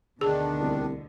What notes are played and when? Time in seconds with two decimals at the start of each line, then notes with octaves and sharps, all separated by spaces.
0.21 D2 B2 D3 D#3 D4 G#4
0.60 C2